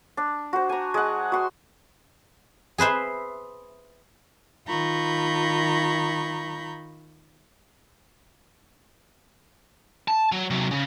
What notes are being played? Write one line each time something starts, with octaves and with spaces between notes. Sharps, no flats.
D4
F#4 C5
G#5 A#5
G#3 F#5
F#4 C6
G#4 B4 C5 E5
D#3 F4 A#5 B5 C#6 G6
A5
F#3
C3 F#3
C#3